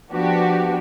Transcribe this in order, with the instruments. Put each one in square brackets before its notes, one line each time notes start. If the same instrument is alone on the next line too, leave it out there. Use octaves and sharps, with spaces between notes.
[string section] F3 B3 D4 F#4 G4